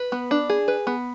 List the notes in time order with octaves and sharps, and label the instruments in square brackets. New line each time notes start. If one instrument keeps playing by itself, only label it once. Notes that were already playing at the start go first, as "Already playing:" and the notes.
Already playing: [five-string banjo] B4
B3
D4
G#4
B4
B3